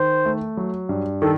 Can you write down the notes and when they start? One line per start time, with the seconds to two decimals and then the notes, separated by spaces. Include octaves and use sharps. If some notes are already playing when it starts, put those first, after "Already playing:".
Already playing: D#3 C5
0.26 A3
0.57 F#3
0.89 G2
1.21 D#3 A4